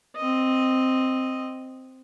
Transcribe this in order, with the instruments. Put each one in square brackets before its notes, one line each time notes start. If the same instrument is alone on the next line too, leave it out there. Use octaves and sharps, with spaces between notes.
[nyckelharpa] C4 D#5